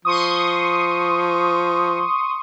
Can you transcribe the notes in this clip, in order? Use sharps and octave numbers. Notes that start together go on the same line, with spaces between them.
F3 C6 C#6 D#6